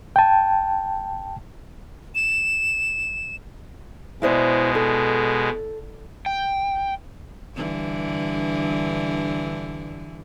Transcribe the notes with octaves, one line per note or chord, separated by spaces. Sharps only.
G5 A5
E7
B2 G#3 E4 C5 D5
A4
G5
G2 D3 E3